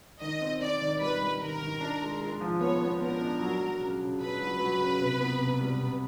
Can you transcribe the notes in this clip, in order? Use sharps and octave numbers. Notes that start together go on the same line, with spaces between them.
D#3 D#5
C4
C4 D5
D#3
G3 B4
G3
D#3 A#4
D#3
D4
G#3
G#3
F3
B3 C#5
B3
B3 A#4
D4
F#3
F#3
C#3
C#3
C#3 B4
F#3
F#3
C#3
C3
B3
C3
G3
C3